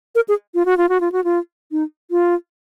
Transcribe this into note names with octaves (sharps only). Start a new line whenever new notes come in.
A#4
G#4
F4
F#4
F4
F#4
F4
F#4
F4
D#4
F4